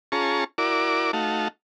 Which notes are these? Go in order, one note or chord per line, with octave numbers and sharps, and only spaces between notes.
C#4 F4 G#4 A5 A#5 C#6
E4 F#4 A#4 D5 D6
A3 D#4 F#4 F5 A5